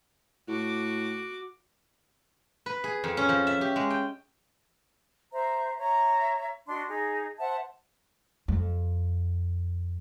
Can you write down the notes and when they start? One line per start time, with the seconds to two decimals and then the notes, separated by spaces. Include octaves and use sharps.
0.48 A2 F#4 D6
2.66 B4
2.84 G#4
3.04 F2
3.17 C#4
3.29 F3
3.47 E5
3.61 G4
3.76 G#3
3.90 G5
5.32 C5 E5 A#5
5.78 C#5 E5 A#5
6.67 D4 F#4 D#5 C6
6.90 D#4 G#4
7.39 C5 E5 F#5 A5
8.48 F2